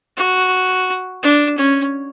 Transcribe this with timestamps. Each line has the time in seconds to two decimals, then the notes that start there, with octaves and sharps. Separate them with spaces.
0.17 F#4
1.23 D4
1.58 C#4